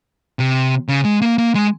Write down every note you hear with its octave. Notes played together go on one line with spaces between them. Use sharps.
C3
C#3
G#3
A#3
A#3
G#3